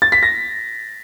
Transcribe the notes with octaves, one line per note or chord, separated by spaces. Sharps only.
A6
B6
A#6